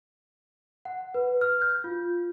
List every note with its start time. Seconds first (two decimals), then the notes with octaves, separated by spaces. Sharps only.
0.85 F#5
1.14 B4
1.41 F6
1.61 G6
1.84 F4